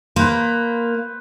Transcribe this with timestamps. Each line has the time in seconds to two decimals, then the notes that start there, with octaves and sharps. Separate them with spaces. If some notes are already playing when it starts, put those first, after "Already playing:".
0.16 A#3 B4 C5